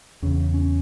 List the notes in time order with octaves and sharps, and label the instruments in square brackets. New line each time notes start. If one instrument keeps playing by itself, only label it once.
[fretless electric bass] E2 C#3 C#4
C#4